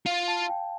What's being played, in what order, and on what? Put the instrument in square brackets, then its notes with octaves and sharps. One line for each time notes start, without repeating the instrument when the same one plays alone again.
[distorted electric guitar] F4 [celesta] F5
[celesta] A5
G5